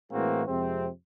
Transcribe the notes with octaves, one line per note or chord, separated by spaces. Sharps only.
A2 E3 G#3 A#3 C4 F#4
F2 C3 G#3 C4